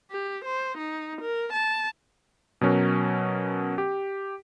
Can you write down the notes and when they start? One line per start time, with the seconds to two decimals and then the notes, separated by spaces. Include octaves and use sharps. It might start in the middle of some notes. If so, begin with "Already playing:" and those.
0.11 G4
0.45 C5
0.78 D#4
1.21 A#4
1.53 A5
2.61 B2 F#3 C#4 A#4
3.78 G4